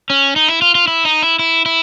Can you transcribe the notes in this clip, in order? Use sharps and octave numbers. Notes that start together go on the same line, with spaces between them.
C#4
D#4
E4
F4
F4
E4
D#4
E4
E4
E4